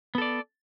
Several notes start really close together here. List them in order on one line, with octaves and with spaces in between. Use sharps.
B3 A4 D5